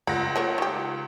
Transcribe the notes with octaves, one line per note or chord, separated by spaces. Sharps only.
C#2 F#5 B5 A#6
G#4 A#4 C#5
D#3 G4